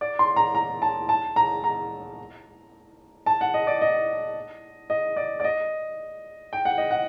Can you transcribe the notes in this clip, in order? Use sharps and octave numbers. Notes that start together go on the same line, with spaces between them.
D5
C6
A#5
A#5
A5
A5
A#5
A#5
A5
F#5
D#5
D5
D#5
D#5
D5
D5
D#5
G5
F#5
D#5
F#5